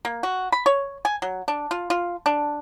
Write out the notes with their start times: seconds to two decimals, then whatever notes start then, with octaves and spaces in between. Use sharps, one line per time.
0.05 A#3
0.23 F#4
0.52 B5
0.66 C#5
1.05 G#5
1.22 F#3
1.48 D4
1.71 F4
1.90 F4
2.26 D4